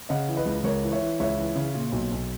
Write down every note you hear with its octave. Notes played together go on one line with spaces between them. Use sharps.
C#3 D#5 F#5
E3
B4 D#5
C#2
C#2 A#4 C#5
E3
C#5 E5
E3
C#2 C#5 E5
E3
C#3
A#2
B1
B1